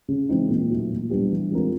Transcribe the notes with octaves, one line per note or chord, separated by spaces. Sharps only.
C#3
E3 G#3 C4 D#4
A#2
F#3
A3
A#2
G3 B3 D4 G4
E3
G#3 C4 F4 A#4